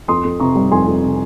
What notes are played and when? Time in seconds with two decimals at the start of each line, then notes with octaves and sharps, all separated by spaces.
0.08 F2 C6 D#6
0.24 F2
0.40 C3 A#5 C#6
0.55 G3
0.71 F2 G#5 C6
0.87 F2
1.03 C3